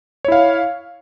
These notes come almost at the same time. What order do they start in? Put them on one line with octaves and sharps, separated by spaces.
C#5 E4 F5